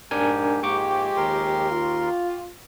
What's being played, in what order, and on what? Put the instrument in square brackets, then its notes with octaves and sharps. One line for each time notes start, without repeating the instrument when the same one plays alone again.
[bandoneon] G#2 G4 [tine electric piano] D4 A#4 G#5
[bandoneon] G#2 A#3 [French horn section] F3 G#3 G4 [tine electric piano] G5 C#6 D6
[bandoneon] D#2 A#4 C6
[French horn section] F4